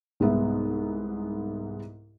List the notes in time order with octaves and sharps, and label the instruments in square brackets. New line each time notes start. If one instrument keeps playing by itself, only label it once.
[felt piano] C2 G#2 G#3 B3 E5